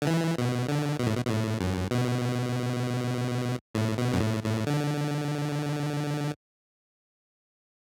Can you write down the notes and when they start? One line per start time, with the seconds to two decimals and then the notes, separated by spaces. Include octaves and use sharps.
0.02 D3
0.07 E3
0.38 B2
0.69 D3
0.99 B2
1.07 A2
1.15 B2
1.25 B2
1.30 A2
1.60 F#2
1.91 B2
3.75 A2
3.98 B2
4.13 F#2
4.20 A2
4.43 A2
4.67 D3